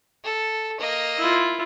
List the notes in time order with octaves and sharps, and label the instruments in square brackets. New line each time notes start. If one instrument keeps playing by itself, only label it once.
[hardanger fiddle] A4
A#3 D#5
[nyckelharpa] E4 F4